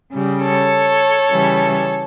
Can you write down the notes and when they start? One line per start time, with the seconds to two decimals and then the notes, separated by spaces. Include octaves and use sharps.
0.13 C#3 G3
0.43 A4 C#5
1.31 C#3 E3 G3